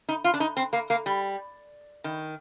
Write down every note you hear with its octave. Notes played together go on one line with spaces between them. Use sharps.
D#4
F4
D4
D#4
C4
A#3
A#3
G3
D#3